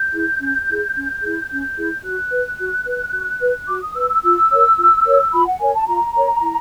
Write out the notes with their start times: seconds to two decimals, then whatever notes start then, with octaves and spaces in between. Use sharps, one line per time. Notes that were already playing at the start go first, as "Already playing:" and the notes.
Already playing: G6
0.13 E4 G#4
0.40 C#4
0.68 E4 G#4
0.95 C#4
1.22 E4 G#4
1.49 C#4 G6
1.77 E4 G#4
2.03 F#4 F#6
2.31 B4
2.59 F#4
2.86 B4
3.13 F#4
3.41 B4
3.68 F#4 D6
3.82 D#6
3.95 B4 E6
4.09 E6
4.23 F4 E6
4.51 A#4 C#5
4.78 F4
5.05 A#4 C#5
5.33 F4 B5
5.46 F#5
5.59 A#4 C#5 G#5
5.74 A5
5.86 F4 A#5
6.15 A#4 C#5
6.41 E4